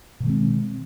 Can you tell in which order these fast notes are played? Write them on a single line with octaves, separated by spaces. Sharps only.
B2 D#3 G#3 C4